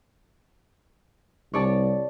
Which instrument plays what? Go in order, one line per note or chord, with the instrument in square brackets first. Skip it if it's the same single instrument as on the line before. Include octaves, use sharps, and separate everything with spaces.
[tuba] C2 [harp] C#5 D5 A5